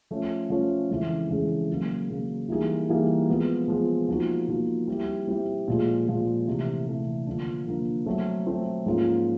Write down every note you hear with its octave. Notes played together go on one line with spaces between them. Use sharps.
F3 A3 C#4
F3 A3 C#4
F2 C#3 E3 G#3
F2 C#3 E3 G#3
C#3 F#3 A#3
C#3 F#3 A#3
E3 G3 A#3 D#4 G#4
E3 G3 A#3 D#4 G#4
F3 G#3 B3
F3 G#3 B3
F3 A#3 D#4 F#4
F3 A#3 D#4 F#4
G3 C4 E4 G4
G3 C4 E4 G4
A#2 F3 G#3
A#2 F3 G#3
C3 E3 A3
C3 E3 A3
D3 F3 A#3 D4
D3 F3 A#3 D4
F#3 A3 C4
F#3 A3 C4
G#2 F3 A#3 C#4 F4